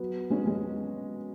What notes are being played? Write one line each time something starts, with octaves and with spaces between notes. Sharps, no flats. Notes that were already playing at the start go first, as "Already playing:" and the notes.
Already playing: F#3 B3
G#3 C#4
G#3 C#4